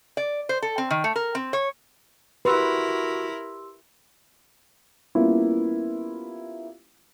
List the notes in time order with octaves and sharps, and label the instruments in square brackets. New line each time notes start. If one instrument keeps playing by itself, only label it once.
[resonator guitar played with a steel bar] D5
C5
A4
C4
D#3
A3
A#4
C4
C#5
[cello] E4 A#4 [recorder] F#4 [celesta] G4 C6 E6 [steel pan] B4
[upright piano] G3 A#3 B3 C#4 E4 F4